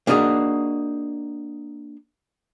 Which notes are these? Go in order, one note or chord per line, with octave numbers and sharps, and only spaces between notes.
A#3 D4 D#4 F#4 G#4